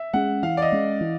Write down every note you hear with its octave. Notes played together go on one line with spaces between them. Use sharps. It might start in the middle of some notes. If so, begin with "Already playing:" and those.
Already playing: E5
G#3 C#4 F#5
E3 F5
D5
D#5
G#3 C#4
E3